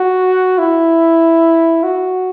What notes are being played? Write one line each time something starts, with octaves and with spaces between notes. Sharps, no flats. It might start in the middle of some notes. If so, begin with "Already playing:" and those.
Already playing: F#4
E4
F#4